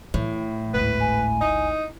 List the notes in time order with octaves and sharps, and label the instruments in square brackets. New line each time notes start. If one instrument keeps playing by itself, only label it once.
[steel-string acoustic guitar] A2 [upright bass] E3 [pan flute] E4
[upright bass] G#1 D2 [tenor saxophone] B4
[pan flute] G#5
[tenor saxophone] D#4